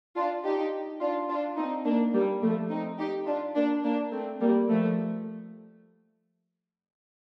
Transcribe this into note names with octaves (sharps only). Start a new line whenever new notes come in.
D4 F4
D#4 G4
D4 F4
D4 F4
C4 D#4
A#3 D4
G3 A#3
F3 A3
C4 D#4
D#4 G4
D4 F4
A#3 D4
A#3 D4
A3 C4
G3 A#3
F3 A3